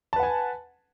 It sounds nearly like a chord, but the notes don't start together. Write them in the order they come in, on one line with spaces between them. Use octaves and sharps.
A5 B4 F#5 G#5